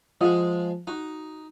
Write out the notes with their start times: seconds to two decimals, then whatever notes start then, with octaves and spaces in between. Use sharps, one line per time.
0.21 F3 G#3 F4 D#5 F#5
0.87 D#4 F#4